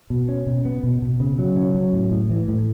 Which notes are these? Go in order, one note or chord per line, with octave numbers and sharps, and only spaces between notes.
B2
C#4
B2
B3
B2
B2
C#3
F#3
C#4
F#3
A2
A2
E3
A2